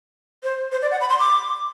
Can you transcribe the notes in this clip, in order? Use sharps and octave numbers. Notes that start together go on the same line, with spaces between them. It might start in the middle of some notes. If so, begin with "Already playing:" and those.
C5
C5
D5
F#5
B5
C6
D6